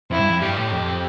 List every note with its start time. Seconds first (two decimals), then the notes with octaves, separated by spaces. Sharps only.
0.11 F2 E4
0.20 G2
0.30 F2
0.42 G2 G4
0.57 A2
0.72 F2